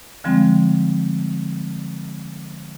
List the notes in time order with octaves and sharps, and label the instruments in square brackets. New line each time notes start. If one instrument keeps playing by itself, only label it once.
[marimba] D3 F3 G3 G#3 C4